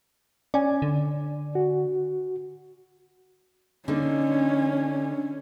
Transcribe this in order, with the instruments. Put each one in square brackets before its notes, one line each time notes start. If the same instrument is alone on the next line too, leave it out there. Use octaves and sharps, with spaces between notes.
[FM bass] C#4 [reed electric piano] D5 G#5
[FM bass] D3
[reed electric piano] F#4
[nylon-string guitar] D3 A#3 D#4 [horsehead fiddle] C#4